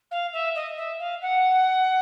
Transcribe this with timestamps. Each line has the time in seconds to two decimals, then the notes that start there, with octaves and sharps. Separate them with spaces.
0.11 F5
0.33 E5
0.55 D#5
0.77 E5
0.99 F5
1.21 F#5